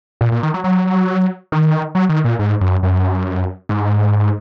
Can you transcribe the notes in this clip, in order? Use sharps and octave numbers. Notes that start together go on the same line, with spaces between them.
A#2
A#2
D#3
F#3
F#3
D#3
F#3
D#3
A#2
G#2
F#2
F#2
G#2